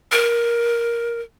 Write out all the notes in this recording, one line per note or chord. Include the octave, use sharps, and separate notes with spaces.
A#4